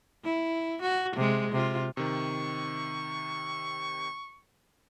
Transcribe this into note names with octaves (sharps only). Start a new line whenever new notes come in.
E4
F#4
C3 G#3
C3 F4
C3 D#3 C#6